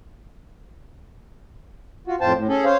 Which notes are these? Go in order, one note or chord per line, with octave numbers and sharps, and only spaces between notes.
F4 F#4
F2 A2 F4 C5 G5 A5
A2
C#4 G#4 A4
C5 C#5 F5